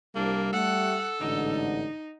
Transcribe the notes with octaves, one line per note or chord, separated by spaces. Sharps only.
C2 G3 A#3 D4
A3 G4 A4 F#5
A1 G#2 D3 D#4